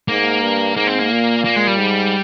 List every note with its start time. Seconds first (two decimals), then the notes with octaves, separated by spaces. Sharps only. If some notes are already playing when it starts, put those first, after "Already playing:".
0.08 G#2 A#3
0.42 G2
0.76 G#2 A#3
0.87 C4
0.99 A#3
1.11 A#2
1.44 A#3
1.56 G#3
1.67 G3
1.78 G#2